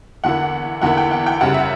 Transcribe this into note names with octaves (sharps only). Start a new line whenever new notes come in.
E2 D3 A#3 E4 F#5
E2 D3 A#3 E4 F#5
G5
F#5
G5
F#2 C#3 G3 F#5
E5